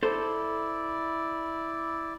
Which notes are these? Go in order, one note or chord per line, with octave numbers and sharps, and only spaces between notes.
E4 A4 C5 D5